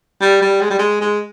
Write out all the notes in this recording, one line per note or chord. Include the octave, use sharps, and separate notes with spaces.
G3
G3
G#3
G3
G#3
G#3